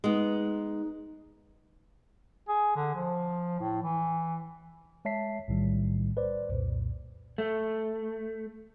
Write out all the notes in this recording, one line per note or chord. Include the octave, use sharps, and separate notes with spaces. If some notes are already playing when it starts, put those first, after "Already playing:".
G#3 B3 D#4
G#4
D3
F3
A2
E3
G#3 C#5 E5 A5 B6 C7
B1 A2 D#3 G3
B4 C5 D5
C2 F2 A#2
A3